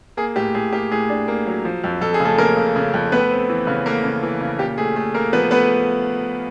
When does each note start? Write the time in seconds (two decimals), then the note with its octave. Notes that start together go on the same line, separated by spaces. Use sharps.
0.17 A#3 G#4
0.36 A2 G4
0.54 A2 G#4
0.73 A#3 G4
0.92 A2 G#4
1.09 D4
1.28 A#3
1.47 F#3
1.65 F3
1.84 F2
2.01 F2 A4
2.14 G#4
2.20 C#3
2.25 A3 A4
2.38 C#3 A#3 A#4
2.57 C#3
2.76 C#3
2.94 F2
3.12 A3 B3 B4
3.31 C4
3.49 E3
3.67 C#3
3.85 A3 A#3 A#4
4.04 C#3
4.23 E3
4.41 C#3
4.59 A#2 G4
4.78 A3 G#4
4.96 A3
5.14 A3 A#3 A#4
5.33 F3 B3 B4
5.51 A3 B3 B4